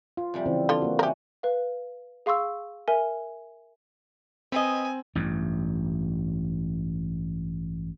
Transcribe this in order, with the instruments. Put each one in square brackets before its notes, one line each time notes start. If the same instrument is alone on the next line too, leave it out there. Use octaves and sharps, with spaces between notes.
[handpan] F4
[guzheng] F2 C3 G3
[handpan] C#3 E3 C4
[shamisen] D3 F4
[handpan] A#3 F#4
[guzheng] C#4 D4 E4 [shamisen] G4 A#4
[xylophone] B4 F5
G#4 F5 C6 C#6 E6
A#4 E5 G#5
[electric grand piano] C4 [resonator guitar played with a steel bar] B4 D#5 [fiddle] G#5
[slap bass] A1 G2